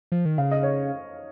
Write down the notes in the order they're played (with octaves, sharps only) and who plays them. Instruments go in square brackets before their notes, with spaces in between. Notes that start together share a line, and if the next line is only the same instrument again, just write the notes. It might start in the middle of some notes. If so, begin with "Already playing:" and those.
[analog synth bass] F3
D#3
[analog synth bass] C#3 [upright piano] F5
[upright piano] D#5
C#5